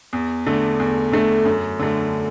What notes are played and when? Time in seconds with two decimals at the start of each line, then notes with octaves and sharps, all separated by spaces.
0.13 E2
0.47 D3 A3
0.80 E2
1.12 D3 A3
1.45 F#2
1.79 D3 A3